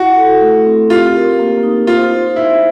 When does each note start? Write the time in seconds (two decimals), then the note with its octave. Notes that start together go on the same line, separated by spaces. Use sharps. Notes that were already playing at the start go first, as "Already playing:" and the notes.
Already playing: E4 F#4
0.16 A4
0.41 A3
0.66 C4
0.90 F4 G4
1.15 A#4
1.39 A#3
1.63 D#4
1.87 F4 C5
2.13 D#4
2.36 D#4 E4